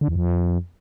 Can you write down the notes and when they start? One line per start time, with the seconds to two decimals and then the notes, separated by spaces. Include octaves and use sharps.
0.01 D3
0.08 E2
0.15 F2